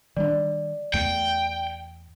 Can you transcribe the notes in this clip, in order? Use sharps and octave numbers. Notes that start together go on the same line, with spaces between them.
D#3 G3 D4 D5
E2 A3 G5